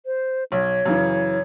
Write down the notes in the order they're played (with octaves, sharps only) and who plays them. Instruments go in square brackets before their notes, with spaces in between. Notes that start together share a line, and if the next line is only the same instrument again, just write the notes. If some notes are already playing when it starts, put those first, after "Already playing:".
[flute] C5
[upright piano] B1 [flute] C#5
[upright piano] F#2 C#3 E3